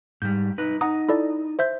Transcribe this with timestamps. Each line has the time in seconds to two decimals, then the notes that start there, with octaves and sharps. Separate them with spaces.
0.22 G#2 G3 G6
0.58 D#4 B4
0.81 D#4 F#5 A#5 D#6
1.09 E4 A4 D5
1.59 C5 E5 G6